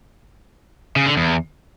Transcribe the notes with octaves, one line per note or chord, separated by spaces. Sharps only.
C#3
D3
E2